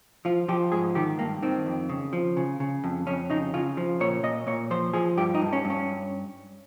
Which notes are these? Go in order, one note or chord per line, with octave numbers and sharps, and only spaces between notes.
F3 F4
F3 G4
G#2 G#4
D#3 G4
G2 A#3
D#3 C4
F2
C#3
F3
C#3
C#3
F2
F2 C#4
C#3 D#4
C#3 F4
F3
A#2 C#5
A#2 D#5
A#2 C#5
F3 C5
F3 G#4
G2 G4
D#4
G2
C#4
G2
C#4